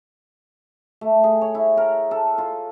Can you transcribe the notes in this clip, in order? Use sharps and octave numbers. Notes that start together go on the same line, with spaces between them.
A3
G#4
C#5
E4
A#4
A4
F4